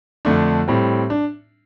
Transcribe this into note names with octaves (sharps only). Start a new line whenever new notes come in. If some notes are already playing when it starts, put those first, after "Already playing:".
F2 D3 A3 D4
A2 G3 C4
D4